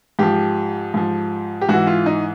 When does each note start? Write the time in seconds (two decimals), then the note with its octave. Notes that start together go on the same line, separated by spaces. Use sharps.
0.19 G#2 F3 G4
0.94 G#2 F3
1.61 G4
1.69 G#2 E3 F#4
1.87 F4
2.06 D#4